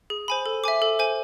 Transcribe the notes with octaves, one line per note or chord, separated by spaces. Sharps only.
G#4
C5 G#5 B5
A4
E5 G#5 D6
A4
C5 G#5